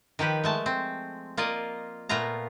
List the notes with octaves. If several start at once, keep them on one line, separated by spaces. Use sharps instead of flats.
D#3 F3 G4 B4
G#3 A3 A5
C4
A#3 F4 D5 D#5
A#2 A3 B3 F4 A#5